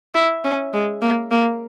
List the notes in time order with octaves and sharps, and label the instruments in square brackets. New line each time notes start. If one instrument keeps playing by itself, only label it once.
[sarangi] E4
C#4
G#3
A#3
A#3